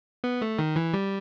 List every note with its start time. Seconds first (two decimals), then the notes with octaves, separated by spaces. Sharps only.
0.24 B3
0.42 A3
0.59 D#3
0.76 E3
0.94 G3